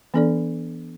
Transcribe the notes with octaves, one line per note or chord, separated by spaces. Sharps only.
E3 B3 D4 A4 D5